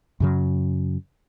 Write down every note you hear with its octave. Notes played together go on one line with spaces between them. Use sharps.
F#2 C#3 F#3